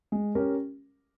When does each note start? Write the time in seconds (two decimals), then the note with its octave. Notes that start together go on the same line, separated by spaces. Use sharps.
0.12 G#3
0.35 C#4 G4 A#4